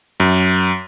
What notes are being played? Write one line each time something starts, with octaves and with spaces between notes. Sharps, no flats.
F#2